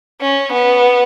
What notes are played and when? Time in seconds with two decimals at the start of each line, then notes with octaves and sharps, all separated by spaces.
0.21 C#4
0.52 B3